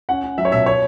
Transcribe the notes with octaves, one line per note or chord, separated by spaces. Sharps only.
C#4 F#5
C#4
F#3 E5
C#5
B2 E5
C#5